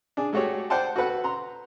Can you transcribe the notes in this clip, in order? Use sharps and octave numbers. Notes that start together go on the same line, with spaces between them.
D4 G#4
G#3 A3 F#4 G4 C#5
C5 D5 F#5 G5 A5 C6
F#4 A4 B4 F#5
A#5 C6